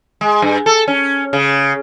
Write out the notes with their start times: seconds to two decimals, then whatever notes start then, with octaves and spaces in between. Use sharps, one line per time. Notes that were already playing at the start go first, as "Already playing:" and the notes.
0.21 G#3
0.42 G2
0.66 A4
0.88 C#4
1.33 C#3